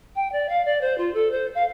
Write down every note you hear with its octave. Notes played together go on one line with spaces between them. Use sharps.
G5
D5
F5
D5
C5
F4
A4
C5
F5